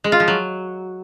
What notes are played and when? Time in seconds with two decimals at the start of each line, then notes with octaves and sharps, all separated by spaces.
0.04 G#3
0.12 F4
0.20 F3
0.28 F#3